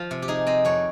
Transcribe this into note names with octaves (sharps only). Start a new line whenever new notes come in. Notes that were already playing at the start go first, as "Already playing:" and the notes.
Already playing: F3 F4
C3
G4
D#4 G#4
C4 D#5
F2 C#5